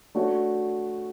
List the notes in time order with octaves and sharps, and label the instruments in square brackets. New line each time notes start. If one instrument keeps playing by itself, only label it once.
[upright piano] A3 D4 F#4 C#5